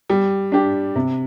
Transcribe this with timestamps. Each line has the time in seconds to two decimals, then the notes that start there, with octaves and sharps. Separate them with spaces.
0.10 G3
0.52 D4 G4
0.96 C3